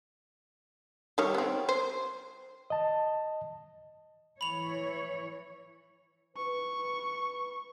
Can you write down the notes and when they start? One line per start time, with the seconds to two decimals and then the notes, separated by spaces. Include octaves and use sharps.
1.18 D#3 G3 C#5
1.35 B3 C4
1.69 C5
2.70 D#5 A5
4.41 E3 C#5 B5 F7
6.37 B4 C#6